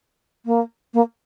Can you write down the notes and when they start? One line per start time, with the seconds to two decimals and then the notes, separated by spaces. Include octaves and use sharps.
0.46 A#3
0.94 A#3